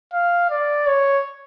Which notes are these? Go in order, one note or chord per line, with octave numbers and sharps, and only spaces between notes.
F5
D5
C#5